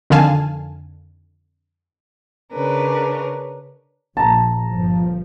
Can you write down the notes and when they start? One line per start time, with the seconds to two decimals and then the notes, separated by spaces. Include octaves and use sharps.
0.10 F2 D3 D#3 F5 G#5 A5
2.53 C#3 C#4 D4 A#4 B4
4.17 A#1 A5 A#5
4.68 G1 F3